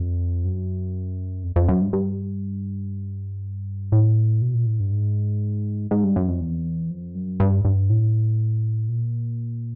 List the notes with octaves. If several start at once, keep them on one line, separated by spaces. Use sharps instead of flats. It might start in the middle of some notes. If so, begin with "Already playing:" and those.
Already playing: F2
F#2
F2
F2
F#2
G2
G2
A2
B2
A#2
A2
G2
G#2
G#2
G2
F#2
F2
E2
F2
F#2
G2
G2
A2
A#2